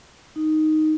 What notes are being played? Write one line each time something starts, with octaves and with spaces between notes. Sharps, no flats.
D#4